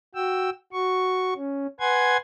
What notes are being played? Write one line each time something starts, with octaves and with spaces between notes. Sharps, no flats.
F#4 G5 E6
F#4 C#6
C#4
B4 F#5 G#5 C6 G#6